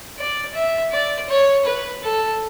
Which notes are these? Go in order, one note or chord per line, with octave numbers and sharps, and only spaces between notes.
D5
E5
D5
C#5
B4
A4